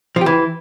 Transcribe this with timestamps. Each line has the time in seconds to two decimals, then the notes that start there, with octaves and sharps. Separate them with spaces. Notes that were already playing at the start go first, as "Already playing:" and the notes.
0.16 F3
0.21 G4
0.26 E3